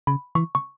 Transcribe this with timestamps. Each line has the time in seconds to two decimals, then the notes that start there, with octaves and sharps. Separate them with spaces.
0.07 C#3 B5
0.35 E3 C#6
0.55 C#6